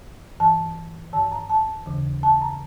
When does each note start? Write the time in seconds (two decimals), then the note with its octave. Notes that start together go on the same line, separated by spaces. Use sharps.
0.40 G2 E3 A5
1.13 G2 D#3 A5
1.32 A#5
1.50 A5
1.86 D#2 C#3 E3
2.23 A5
2.42 A#5